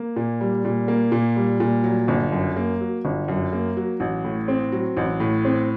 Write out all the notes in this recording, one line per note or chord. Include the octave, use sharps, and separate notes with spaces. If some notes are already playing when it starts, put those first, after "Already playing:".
Already playing: A#3
A#2
G3
A#2
A#3
A#2
G3
A#2
F#3
G1
F#2
A#3
F#3
G1
F#2
A#3
F#3
A1
A2
C4
F#3
A1
A2
C4